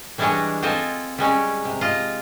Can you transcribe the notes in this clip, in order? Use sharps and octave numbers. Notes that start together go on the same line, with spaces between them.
E3 G3 G#3 D4 C#5 D#5
C4 F4 A4 C5 D#5 G#5
G3 G#3 C#4
C3
F4 D#5